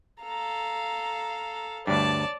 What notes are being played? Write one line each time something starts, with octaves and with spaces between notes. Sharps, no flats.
A4 F5 A#5
D2 G2 C#5 D5 A5